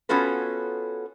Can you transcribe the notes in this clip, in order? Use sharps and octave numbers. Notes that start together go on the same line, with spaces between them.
B3 C#4 F4 F#4 A4 B4